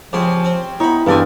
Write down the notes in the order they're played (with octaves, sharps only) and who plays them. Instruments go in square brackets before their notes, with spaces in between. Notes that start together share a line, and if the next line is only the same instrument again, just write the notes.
[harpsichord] C#2 C4 C6 [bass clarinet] F3 [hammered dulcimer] G4 C#5 G#5
[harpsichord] C4
[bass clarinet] B3 [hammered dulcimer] D#4 [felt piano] E4 [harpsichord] C#5 B5
[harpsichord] E2 G4 G#5 [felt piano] G2 [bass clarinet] E3 [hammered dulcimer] C4 A4 F5